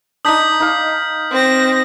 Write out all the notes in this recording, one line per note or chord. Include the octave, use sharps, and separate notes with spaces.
D4 D#4 D#6 G6 B6
D#4 F5
C4 A#6